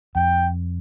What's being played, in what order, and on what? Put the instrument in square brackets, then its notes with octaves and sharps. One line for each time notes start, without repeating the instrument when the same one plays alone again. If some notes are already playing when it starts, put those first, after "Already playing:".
[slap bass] F2 [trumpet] G5